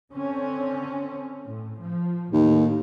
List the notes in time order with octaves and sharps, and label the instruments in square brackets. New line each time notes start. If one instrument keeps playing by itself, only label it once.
[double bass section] D3 C4 C#4
A2
F3
[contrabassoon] D#2 [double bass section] A2